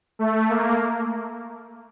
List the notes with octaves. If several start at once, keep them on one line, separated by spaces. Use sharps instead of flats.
A3
A#3